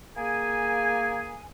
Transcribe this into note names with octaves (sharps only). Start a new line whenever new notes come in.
A#3 G#4 G#5